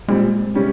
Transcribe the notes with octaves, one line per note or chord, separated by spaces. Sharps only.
A#2 G3 G#3 C4
C3 G3 C#4